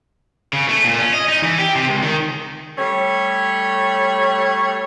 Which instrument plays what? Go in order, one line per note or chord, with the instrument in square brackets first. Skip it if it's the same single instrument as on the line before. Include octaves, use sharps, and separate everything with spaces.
[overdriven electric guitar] C#3
A3
A#2
C#4
D#5
D#4
E3
G4
C3
C#2
D#3
[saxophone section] G3 A3 C#5